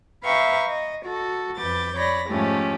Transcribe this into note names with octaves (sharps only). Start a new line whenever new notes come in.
B4 E5 F5 G5 A#5 C#6
D#5
F#4 A4
F2 B4 D6 G6 A6
C#5 D5 B5 A#6
G#2 F3 A3 C#4 G4